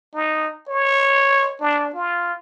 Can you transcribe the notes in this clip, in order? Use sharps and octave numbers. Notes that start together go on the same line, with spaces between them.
D#4
C#5
D4
F4